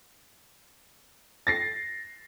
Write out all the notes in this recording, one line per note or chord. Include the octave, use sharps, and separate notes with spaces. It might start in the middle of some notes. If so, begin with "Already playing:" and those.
A6 A#6 C7